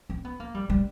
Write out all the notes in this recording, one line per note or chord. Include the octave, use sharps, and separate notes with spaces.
C4
B3
A#3
G3
G3